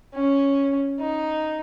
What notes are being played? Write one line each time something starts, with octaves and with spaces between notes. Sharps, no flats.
C#4
D#4